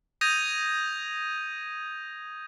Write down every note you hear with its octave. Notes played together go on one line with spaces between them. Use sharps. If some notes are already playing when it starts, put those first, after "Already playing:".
D#6 G6 G#6 A#6 D#7 F7